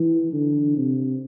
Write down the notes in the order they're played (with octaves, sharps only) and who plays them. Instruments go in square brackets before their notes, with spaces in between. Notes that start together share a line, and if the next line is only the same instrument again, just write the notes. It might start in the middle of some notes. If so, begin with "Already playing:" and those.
Already playing: [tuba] E3
D3
C3